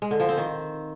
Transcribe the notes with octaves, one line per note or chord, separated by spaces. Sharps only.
G#3
D3
F3
C4
D#3